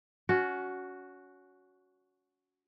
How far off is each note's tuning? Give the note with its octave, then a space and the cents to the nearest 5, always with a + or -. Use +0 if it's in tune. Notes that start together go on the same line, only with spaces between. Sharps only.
C#4 +25 F#4 +0